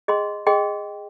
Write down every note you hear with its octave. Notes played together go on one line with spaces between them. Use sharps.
G#4 D#5 G5 C6
G#4 D#5 G5 C6